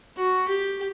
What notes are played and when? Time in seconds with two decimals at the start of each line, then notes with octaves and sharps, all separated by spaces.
0.17 F#4
0.48 G4